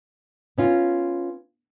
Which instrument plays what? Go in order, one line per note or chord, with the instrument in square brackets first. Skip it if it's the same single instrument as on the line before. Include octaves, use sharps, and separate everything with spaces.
[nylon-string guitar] B3 C#4 F4